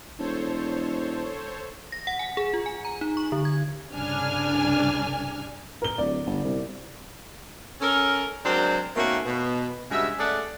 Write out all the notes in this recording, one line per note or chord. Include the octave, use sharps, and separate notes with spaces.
E1 A4 C5 C#5
A#6
F#5
G#5
G#4
F4
G#5
A#5
D#4
C#6
D3
G#6
C2 G2 C#3 D4 G#5 F6
A#4 G7
D1 D5
G1
C2
C#4 A4 A#4
F#3 G#3 C4 D4 A#4 C5
B2 D#3 A3 A#3 C#4 F#4
B2
G2 C#3 G#3 F#4 E5
A3 C#4 G#4 D5 F#5